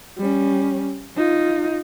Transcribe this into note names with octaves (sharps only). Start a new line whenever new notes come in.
G3 C#4
D#4 F4